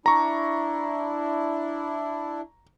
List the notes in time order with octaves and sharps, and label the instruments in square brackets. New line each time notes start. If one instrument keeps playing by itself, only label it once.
[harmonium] D4 E4 [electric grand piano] A#5 C#6